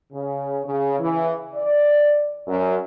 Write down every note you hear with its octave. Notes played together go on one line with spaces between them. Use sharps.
C#3
C#3
E3
D5
F#2